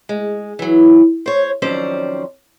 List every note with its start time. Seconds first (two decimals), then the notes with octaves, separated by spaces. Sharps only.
0.09 G#3
0.59 E3 F#3
1.26 C5 C#5
1.62 F2 D#3 F#3 C#4 C5 D5